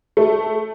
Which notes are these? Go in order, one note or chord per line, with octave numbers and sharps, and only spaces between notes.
A3